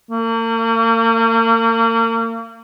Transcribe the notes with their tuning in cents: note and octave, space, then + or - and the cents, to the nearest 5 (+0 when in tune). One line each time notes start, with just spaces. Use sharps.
A#3 -40